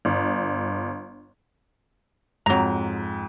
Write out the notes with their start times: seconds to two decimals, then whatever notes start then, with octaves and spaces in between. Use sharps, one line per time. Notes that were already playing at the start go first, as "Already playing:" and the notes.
0.05 G1
2.46 F2 G#2 F#3 A#5